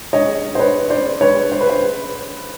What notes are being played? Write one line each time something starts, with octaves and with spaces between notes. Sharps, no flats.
C#5 D#5
C5
B4 C#5
C5 D5
B4 C#5
C5
B4
C5